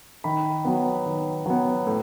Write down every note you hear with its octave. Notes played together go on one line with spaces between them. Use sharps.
D#3 B5
F#3 B3
D#3
F#3 B3
A2